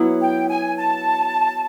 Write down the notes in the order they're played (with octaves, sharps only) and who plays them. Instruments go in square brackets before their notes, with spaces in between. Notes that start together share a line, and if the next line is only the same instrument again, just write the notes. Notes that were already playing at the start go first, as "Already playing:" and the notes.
Already playing: [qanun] F#3 B3 E4
[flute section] G5
G#5
A5